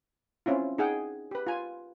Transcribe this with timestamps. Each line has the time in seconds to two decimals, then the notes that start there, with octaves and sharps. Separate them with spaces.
0.46 C4 C#4 E4 F4
0.78 D#4 G#4 F#5 G5
1.31 G4 B4
1.47 F4 G#5